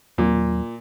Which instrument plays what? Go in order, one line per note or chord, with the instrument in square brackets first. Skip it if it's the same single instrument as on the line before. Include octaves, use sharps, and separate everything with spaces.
[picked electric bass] D#2 F#3 [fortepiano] A#2